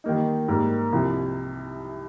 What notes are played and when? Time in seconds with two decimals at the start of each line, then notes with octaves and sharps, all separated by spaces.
0.04 D#3 G3 A#3 D#4
0.48 G#2 G3 A#3
0.92 C2 C3 F3